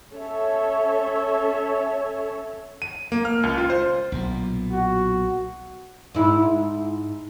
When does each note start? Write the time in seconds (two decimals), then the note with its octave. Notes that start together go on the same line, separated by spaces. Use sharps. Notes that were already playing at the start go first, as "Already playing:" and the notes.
0.13 C#4 A4 C#5 E5
2.82 D#7
3.12 A#3
3.25 F6
3.43 C#2
3.58 F4
3.70 C5
4.12 B1 A#2
4.72 F#4
6.15 G#2 E4